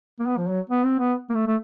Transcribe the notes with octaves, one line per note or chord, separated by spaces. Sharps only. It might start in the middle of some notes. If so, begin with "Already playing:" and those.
A#3
B3
F3
F#3
B3
C4
B3
A#3
A3
A3